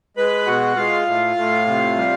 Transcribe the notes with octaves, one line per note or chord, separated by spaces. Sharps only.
G#3 B4 B5
B2 F#4 F#5
G#3 F4 F5
A2
A2
C3
G3